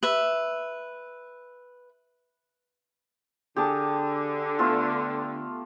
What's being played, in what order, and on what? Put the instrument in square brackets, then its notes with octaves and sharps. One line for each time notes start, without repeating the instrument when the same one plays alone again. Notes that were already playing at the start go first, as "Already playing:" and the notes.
[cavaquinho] B4 E5
[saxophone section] D3 [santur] G4 G#4 A5
[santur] A3 B3 F4